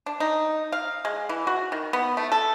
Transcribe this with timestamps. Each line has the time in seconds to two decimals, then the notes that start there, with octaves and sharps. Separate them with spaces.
0.06 D4
0.20 D#4
0.72 F5
1.05 G#3
1.29 E3
1.47 F#4
1.72 D#3
1.93 B3
2.17 A3
2.32 A4